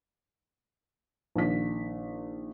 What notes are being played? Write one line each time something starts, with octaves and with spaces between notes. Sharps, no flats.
A#1 D#3 B6